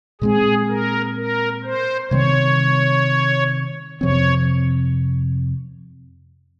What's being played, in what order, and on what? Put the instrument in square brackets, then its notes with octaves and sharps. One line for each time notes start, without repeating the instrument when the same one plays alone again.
[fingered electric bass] A#2 G#3 C4 [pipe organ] G#4
[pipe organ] A#4
A#4
C5
[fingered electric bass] C3 D#3 G3 C4 [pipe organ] C#5
[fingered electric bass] F2 C3 F3 C4 [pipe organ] C#5